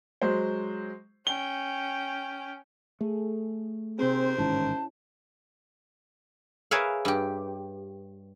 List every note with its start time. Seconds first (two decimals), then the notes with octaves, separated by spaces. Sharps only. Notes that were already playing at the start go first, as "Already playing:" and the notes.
0.22 F#3 G#3 C5
1.27 C#4 G5 G7
3.01 A3 G#4 A4
3.99 D#2 C3 C4 G#4 A#4 C5
4.38 A1 G#2 D#3 C#4 E4 A5
6.71 G#4 A#4 B4 C#5 E5 F5
7.05 G2 G4